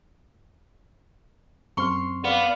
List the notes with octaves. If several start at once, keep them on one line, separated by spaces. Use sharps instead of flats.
F#2 C4 C6 C#6 F6
B3 D5 F5